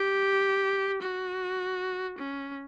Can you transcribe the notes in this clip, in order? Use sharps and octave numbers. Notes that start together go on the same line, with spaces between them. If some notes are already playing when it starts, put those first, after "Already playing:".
Already playing: G4
F#4
C#4